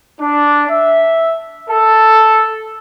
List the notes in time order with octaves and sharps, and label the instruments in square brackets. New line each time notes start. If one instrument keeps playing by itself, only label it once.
[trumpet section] D4
E5
A4